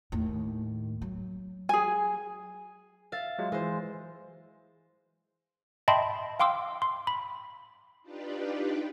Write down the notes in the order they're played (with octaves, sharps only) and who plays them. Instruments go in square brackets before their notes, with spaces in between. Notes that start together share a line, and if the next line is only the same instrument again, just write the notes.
[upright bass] D#2 A2
F#3
[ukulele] G#4 G#5
[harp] E5 F5 A6
[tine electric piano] F#3 G#3 F4
[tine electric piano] E3 [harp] G#3 C5
[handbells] D#5 E5 G5 A5 B5 C6
F5 G5 C6 D6 E6
C6
B5
[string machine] D4 D#4 F4 G4 B4 D5